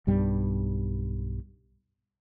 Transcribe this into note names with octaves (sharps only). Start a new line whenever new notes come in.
B1 G2 G3